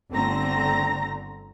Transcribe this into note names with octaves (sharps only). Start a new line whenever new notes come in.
G1 D3 A3 C4 A#5 A#6